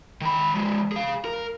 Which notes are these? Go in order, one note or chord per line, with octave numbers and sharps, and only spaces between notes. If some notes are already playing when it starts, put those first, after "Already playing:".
D#3 B5
F3 G#3
G#4 F5
A#4